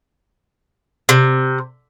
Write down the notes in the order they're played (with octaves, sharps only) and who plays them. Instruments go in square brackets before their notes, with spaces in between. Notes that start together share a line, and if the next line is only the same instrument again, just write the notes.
[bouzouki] C3